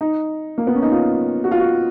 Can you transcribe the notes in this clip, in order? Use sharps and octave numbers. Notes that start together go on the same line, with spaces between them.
D#4
A#3
B3
C#4
D#4
F4
F#4
F4
F#4